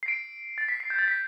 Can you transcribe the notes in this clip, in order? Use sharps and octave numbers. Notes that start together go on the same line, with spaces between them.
C7
D7
A6
B6
C7
G6
A6
B6